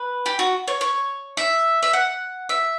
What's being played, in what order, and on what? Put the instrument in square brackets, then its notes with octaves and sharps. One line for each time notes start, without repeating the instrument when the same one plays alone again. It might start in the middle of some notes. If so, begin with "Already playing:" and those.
Already playing: [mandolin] B4
G4
F#4
C#5
C#5
E5
E5
F#5
E5